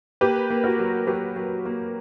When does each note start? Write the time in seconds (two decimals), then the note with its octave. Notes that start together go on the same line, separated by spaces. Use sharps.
0.21 A#3 G4 B4
0.50 A#3
0.64 F#4 A#4
0.79 F#3
1.07 F#3 G4 B4
1.36 F#3
1.65 A#3